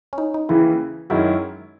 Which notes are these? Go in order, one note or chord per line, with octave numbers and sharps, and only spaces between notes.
C#4
D#4
D#4
D#2 C#3 E3 E4
F#2 D#3 G#3 C#4 E4 F#4